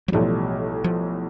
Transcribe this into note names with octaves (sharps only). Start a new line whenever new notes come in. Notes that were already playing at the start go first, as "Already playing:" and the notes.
F#3
B1 A2 E3 F3 G3
F3